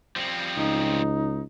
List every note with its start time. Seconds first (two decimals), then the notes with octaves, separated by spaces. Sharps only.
0.16 F3 G3 C4
0.57 C#2 D#4